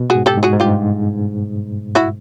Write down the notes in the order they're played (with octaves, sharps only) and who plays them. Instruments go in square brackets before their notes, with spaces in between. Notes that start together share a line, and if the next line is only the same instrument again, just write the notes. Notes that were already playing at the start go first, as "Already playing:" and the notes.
Already playing: [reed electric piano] B2
[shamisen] F#4 G#4
[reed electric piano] G#2
[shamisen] G4 A4
[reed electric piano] G#2
[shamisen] F#4 G#4
[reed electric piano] G#2
[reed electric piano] G2 [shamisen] F4 G4
[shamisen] E4 F#4